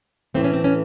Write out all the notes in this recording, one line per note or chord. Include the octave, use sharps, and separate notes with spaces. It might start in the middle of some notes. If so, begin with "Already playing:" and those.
A2 E3 A3 C4
C#4
C4
C#4